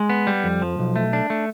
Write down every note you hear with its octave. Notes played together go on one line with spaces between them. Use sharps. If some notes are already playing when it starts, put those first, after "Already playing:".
Already playing: G#3
B3
G3
F2
F3
B1
A3
D4
A3